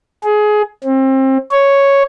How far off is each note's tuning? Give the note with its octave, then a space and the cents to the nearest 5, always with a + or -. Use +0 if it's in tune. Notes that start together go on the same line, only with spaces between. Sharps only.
G#4 +20
C4 +30
C#5 +0